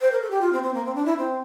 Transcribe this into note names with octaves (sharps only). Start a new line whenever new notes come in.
C5
A#4
A4
G4
F4
C4
C4
A#3
C4
D4
E4
C4